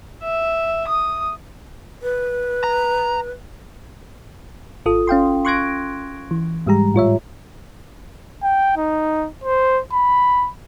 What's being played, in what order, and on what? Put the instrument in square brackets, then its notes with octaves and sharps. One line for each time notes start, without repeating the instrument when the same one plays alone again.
[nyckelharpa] E5
D#6
[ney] B4
[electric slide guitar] A#5
[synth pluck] G#1 F4 A4 D#6
C#4 F5 G5 C6
C6 C#6 F#6 G#6 A#6 D7
E3
G#2 G3 G#3 G4 A#5
A2 F4 C#5 E5
[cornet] G5
D#4
C5
B5